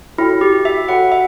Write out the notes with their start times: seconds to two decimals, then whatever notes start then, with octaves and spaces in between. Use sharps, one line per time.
0.18 E4 F#4 A4 C#5 G5 B5
0.41 G4
0.65 E5
0.88 F#4 A4 C#5 F#5 G5 B5
1.12 E5